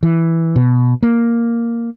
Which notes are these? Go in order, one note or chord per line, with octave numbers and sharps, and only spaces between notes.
E3
B2
A#3